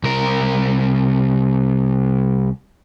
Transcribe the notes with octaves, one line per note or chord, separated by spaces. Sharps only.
C2 A#4